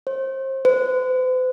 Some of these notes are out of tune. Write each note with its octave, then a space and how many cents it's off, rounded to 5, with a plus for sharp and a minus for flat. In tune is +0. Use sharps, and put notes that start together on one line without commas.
C5 +30
C5 -45